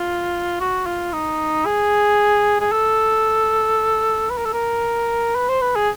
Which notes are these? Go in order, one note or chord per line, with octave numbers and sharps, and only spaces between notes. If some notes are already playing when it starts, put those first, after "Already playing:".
Already playing: F4
F#4
F4
D#4
G#4
G#4
A4
B4
A#4
A4
A#4
B4
C5
B4
G#4